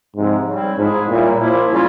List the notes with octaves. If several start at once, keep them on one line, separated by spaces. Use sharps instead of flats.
G#2 C3 F3 G#3 C4
C#3 G3 C4 E4
G#2 F3 G#3 E4 G#4
A#2 C#3 G3 A#3 E4
F3 A#3 E4
C#3 G3 C#4 F4